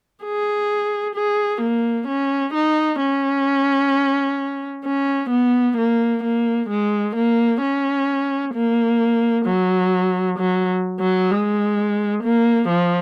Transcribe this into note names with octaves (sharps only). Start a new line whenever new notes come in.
G#4
G#4
A#3
C#4
D#4
C#4
C#4
B3
A#3
A#3
G#3
A#3
C#4
A#3
F#3
F#3
F#3
G#3
A#3
F3